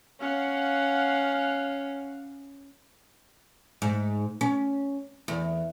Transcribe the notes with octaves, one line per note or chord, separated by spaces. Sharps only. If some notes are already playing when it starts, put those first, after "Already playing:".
C#4 F5 F#5
G#2
C#4
E2